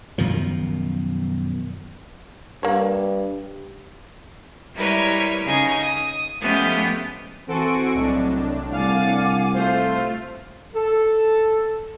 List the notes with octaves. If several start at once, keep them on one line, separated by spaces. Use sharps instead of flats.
F#2 B2 D#3 F3
G2 A#3 C#5
G3 G#3 E4 A#4 B4 C#5
C#3 D#4 G#5
D#6
F3 G#3 A3 B3 C#4 G4
E3 C4 F#4 A4 C5 G#5 C#6 D7
C2 A2 F#3 D4 D#5
C2 F5 F#5 G#5 D6 A6
A3 F4 A4 C5
A4